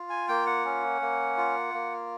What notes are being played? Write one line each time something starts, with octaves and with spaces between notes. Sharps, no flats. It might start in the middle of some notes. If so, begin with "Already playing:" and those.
Already playing: F4
G#5
A#3 G5
F#5
C#4
A#3
F4
A#3